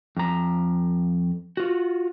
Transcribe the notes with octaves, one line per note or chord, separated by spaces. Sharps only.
F2 A#5
F4 F#4